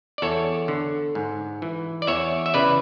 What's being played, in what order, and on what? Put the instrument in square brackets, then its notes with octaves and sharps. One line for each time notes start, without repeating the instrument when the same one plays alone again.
[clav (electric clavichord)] D5
E2 A4 C#5
D3
G#2
E3
D5
E2 C#5 E5
E5
C#3 E3 B4 D5